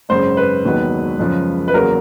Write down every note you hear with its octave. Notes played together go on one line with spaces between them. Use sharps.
G#1 F#2 C#3 C5
B4
E1 D#2 D#3 F#3 B3
F#2 C#3 F3 G#3
B4
E2 C#3 F#3 A#3 A#4